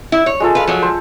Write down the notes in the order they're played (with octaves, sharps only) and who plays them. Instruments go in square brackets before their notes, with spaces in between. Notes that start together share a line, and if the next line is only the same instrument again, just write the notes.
[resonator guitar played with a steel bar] E4
C#5
[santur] G#3 F4 A4
[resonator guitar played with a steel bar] B4 F5
F3 F#3
[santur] C5 A5